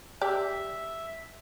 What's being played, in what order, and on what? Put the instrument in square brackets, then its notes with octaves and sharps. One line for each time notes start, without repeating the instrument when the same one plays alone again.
[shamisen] G4 D5 [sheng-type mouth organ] E5